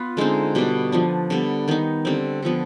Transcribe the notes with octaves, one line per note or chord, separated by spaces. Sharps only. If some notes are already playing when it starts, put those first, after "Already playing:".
Already playing: B3 F4 B4
D3 G#3 C4 D#4
B2 G3 D4
F3 B3 D4
D3 G3 B3
D#3 B3 D#4
D3 G3 C4
D3 F3 B3